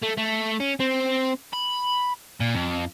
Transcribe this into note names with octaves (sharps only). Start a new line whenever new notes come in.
A3
A3
C#4
C4
B5
A#2
F2